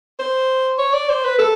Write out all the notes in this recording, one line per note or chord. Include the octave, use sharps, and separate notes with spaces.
C5
C#5
D5
C5
B4
A4